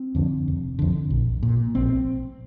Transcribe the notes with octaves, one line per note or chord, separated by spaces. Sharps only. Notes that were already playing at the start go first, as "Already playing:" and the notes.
Already playing: C4
F2 D3
F1
F2 D3
A#1
A#2
A#1 C4